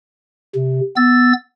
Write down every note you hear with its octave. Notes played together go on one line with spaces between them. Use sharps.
C3
B3 E6 A6